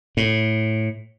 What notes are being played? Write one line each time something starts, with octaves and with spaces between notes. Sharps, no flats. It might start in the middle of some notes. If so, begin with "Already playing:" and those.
A2